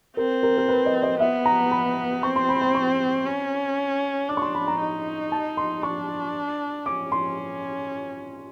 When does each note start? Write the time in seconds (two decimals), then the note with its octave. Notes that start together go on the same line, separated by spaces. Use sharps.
0.17 C4 A#4
0.43 A#4
0.58 A#4
0.68 B4
0.86 D#5
1.03 D#5
1.20 B3 E5
1.46 A#5
1.71 B5
2.23 C4 C#6
2.36 C6
2.49 B5
2.62 C6
2.75 C#6
3.25 C#4
4.29 D4 D6
4.37 C#6
4.42 C6
4.55 B5
4.68 A#5
4.81 D#4
5.32 A5
5.57 C6
5.83 D4 C#6
6.86 C#4 D6
7.12 C6